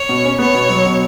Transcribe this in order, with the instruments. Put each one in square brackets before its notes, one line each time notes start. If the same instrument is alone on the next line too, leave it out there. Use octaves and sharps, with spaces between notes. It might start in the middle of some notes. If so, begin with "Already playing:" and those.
Already playing: [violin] C#5
[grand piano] B2
C#4
[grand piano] B3 [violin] C#5
[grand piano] B2
F#3
B2